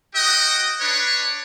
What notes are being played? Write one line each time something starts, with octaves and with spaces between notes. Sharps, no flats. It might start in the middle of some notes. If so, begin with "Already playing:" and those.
F#4 D#5 G5
D4 B4 C#5